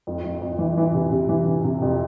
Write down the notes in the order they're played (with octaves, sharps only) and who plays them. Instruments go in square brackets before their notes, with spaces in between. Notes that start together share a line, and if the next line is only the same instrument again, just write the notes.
[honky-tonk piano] F2
F2
F2
E3
E3
C3
C3
E3
C3
C3
F2